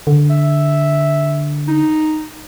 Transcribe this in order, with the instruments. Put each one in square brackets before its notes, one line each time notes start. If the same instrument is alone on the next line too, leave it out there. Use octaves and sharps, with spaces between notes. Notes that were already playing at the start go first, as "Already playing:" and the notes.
[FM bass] D3
[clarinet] E5
D#4